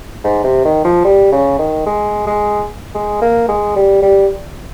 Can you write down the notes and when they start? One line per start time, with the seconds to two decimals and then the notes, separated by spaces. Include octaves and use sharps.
0.24 G#2
0.44 C3
0.65 D#3
0.85 F3
1.05 G3
1.32 C#3
1.59 D#3
1.86 G#3
2.27 G#3
2.95 G#3
3.22 A#3
3.48 G#3
3.76 G3
4.02 G3